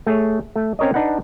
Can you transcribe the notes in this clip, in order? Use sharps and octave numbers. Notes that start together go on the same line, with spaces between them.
A3 G#4 C#5
A3
C4 C#4 A#4 C#5 D#5
D4 D#4 B4 F#5